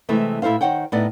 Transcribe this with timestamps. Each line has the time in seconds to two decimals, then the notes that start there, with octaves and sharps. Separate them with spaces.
0.09 C3 E3 G#3 A3 C4
0.42 A2 E4 A4 C5 F5
0.61 D#3 C5 C#5 F#5 G5
0.92 A2 B3 D#4 D5 F#5